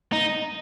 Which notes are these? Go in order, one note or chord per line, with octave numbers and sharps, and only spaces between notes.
D#4